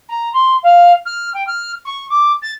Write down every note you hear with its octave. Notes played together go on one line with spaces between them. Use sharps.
A#5
C6
F5
F6
G5
F6
C#6
D6
A6